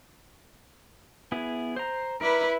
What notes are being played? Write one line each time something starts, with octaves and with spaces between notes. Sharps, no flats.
B3 E4 G#4
C5 A#5
E4 A#4 B4 D5